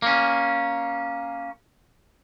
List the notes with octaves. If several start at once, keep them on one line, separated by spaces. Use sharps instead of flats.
A#3 C#4